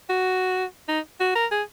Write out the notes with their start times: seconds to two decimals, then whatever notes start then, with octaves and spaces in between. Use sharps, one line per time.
0.09 F#4
0.88 D#4
1.20 F#4
1.35 A#4
1.51 G#4